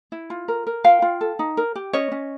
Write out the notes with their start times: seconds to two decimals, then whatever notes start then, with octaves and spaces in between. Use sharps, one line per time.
0.12 E4
0.30 F4
0.48 A#4
0.67 A#4
0.84 F4 F5 G5
1.02 F4
1.21 A4
1.39 D#4
1.57 A#4
1.75 G4
1.93 C#4 C#5 D#5
2.12 C#4